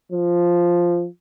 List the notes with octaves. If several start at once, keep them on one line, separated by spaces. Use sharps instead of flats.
F3